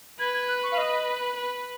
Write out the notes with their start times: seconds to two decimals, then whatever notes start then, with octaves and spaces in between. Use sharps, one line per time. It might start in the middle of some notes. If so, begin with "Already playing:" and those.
0.19 B4 G#6
0.34 G#6
0.48 F#6
0.63 C#6
0.72 F5
0.78 D#5
1.37 B4